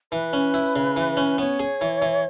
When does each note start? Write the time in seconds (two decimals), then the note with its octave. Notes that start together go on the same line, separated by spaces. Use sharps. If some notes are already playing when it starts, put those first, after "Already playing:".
0.12 E3 B4
0.33 C#4
0.54 E4
0.76 C#3
0.96 E3
1.17 C#4
1.38 B3 C#5
1.60 G#4
1.81 E3
2.02 E3